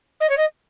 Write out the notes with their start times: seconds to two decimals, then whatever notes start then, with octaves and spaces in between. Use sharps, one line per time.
0.20 D#5
0.29 C#5
0.37 D#5